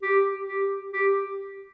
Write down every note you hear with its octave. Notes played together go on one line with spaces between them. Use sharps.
G4
G4
G4